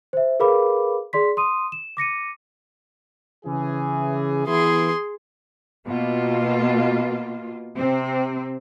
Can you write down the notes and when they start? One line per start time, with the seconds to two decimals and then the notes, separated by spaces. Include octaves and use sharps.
0.13 C5 E5
0.40 G#4 A#4 B4 F5 B5 D6
1.13 G#4 D5 C6 B6
1.37 C6 D#6 D#7
1.72 E7
1.97 D6 A#6 C#7 D#7
3.46 C#3 E3 G#4
4.47 E3 B3 E4 G#4 C6
5.87 B2 A#3 F4
7.76 C3 C4